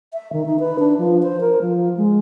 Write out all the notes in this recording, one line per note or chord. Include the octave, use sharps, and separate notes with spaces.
E5
D#3
D#4
B4
D4
F3
C5
A#4
F3
G#3